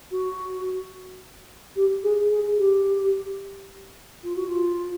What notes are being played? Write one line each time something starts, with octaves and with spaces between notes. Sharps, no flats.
F#4
G4
G#4
G#4
G4
F4
F#4
F4